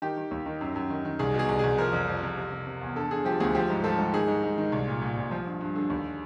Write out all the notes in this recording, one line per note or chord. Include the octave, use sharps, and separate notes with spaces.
D#3 G4
D#3
D#2
D#3
F#2
F#2
D#3
D#3
C2 G#4
B2
G#4
C2
C2 G#4
F3 A#4
F2
F3
F2
C3
C3
C3
E2
D3 A4
D3 G#4
F3 G4
D2 G#4
F3 G4
G#2
F3 A4
G#2
D#3 G#4
G#2
G#2
D#3
C2
A#2
A#2
A#2
F3
G2
G2
D3
D#2